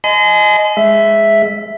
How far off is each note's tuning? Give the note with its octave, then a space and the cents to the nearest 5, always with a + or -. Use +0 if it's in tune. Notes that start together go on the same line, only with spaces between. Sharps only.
D#5 +0 G#5 +30 C6 -40
G#3 +0 E5 +0